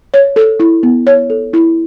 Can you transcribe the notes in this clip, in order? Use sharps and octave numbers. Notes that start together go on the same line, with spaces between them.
C#5
A4
E4
B3
C#5
A4
E4